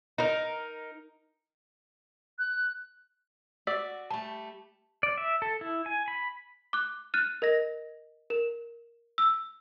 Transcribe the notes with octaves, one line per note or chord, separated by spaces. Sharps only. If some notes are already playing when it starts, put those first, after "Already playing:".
D#4 A#4
F#6
F#4 D5 E6 B6
G3 A3 A5
D5
E5
A4
E4
G#5
B5
D6 F#6
F6 F#6 A6 D#7
A#4 D#5 A#6
A#4 E7
E6